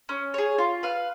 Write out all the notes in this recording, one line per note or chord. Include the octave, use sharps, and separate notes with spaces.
C#4
G#4 C#5
F4
B4 F5